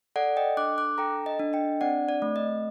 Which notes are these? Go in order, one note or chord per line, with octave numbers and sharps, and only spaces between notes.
A4 D5 F#5
D#5 G5
D4 D6 F#6
D6 F#6
A4 G5 A#5
D#5
D4
D#5 G5
C4 D5 F#5
D5
A3
D#5